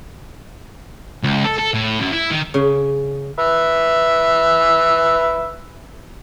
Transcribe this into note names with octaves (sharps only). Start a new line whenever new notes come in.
C#2
A4
A4
A2
F#2
E4
D#3
C#3
B4 E5